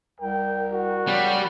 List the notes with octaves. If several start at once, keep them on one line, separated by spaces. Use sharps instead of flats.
C2 A#4 G5
F#4
C#3 G3